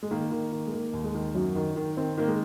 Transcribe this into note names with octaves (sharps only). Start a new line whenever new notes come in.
G#3
D#3 A#3
D#3
D#3
G#3
D#3 A#3
D#2
G#3
D#3
F#2 F#3
D#3
D#3
D#3 C4
D#3 A#3
G#3